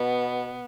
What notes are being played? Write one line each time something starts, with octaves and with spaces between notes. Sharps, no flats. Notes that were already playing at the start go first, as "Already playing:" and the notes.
Already playing: B2 B3